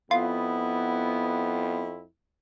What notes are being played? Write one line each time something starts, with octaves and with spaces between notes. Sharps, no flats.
F2 B3 E4 F4